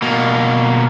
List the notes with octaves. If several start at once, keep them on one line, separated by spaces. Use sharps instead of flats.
B2 A#3